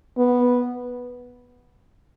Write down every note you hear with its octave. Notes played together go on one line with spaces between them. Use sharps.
B3